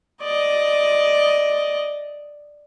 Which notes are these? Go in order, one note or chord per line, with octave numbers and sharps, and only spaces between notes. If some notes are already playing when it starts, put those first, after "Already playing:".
D5 D#5